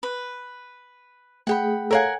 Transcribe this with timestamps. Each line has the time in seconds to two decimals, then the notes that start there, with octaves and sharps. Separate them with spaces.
0.03 B4
1.47 A3 G#4 F#5 G5 B5
1.91 A4 A#4 C#5 F5 F#5 G#5